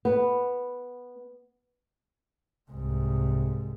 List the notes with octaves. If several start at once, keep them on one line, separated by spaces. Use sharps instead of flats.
B3
C2 G#2